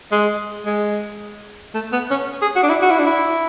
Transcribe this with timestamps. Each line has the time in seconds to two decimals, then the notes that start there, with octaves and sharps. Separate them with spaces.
0.12 G#3
0.66 G#3
1.74 A3
1.93 B3
2.10 C#4
2.42 G#4
2.56 F#4
2.63 D4
2.69 E4
2.83 F#4
2.91 E4
2.99 D4
3.07 E4